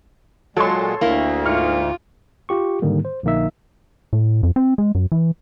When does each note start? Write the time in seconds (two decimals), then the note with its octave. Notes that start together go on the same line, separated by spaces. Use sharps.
0.57 A#2 F#3 G#3 A4 C#5 C6
1.01 D2 A#3 E4
1.45 G#2 F4 F6 C#7
2.49 F4 G4 C#6
2.82 G#2 D3 D#3 G3 A#3
3.05 C5
3.23 A#1 D3 A#3 D#4 E5
4.13 A2
4.43 F2
4.56 C4
4.78 G#3
4.95 F#2
5.12 E3